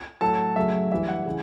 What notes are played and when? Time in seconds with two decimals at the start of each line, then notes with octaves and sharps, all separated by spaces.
0.21 A2 F#3 A3 A4 A5
0.56 F#2 C#3 F#3 A3 E5
0.91 G2 E3 G3 E5
1.09 F#5
1.26 C#3 E3